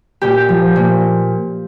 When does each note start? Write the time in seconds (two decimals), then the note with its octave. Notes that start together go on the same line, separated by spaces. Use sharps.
0.22 A#2 G4
0.49 F3
0.76 A#2